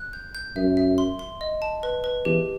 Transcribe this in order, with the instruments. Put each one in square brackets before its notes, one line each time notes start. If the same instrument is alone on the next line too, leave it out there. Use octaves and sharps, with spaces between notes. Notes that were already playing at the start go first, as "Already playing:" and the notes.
Already playing: [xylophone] F#6
G6
G6
[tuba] F#2 [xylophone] E5
[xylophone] E5
C6
C6
D#5
A5
B4
B4
[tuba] E2 [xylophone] G4